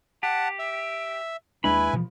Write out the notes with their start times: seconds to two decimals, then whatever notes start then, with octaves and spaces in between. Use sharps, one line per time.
0.23 G4 F#5 A5
0.59 E5
1.64 D#2 G#3 D4 E4 B4 G#5 B5
1.93 B2 E3 F3